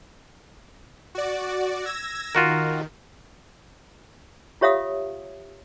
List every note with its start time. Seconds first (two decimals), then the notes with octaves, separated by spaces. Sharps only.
1.15 F#4 D5
1.85 E6 G#6 A#6
2.35 D#3 F4 F#4 A#4
4.61 F4 G4 C#5 E5 F5 D#6